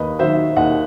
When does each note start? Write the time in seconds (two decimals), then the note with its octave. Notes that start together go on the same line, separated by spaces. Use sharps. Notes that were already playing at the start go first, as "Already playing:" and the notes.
Already playing: D#2 B4 D#5
0.19 D#3 F#3 C5 E5
0.57 D#2 D#5 F#5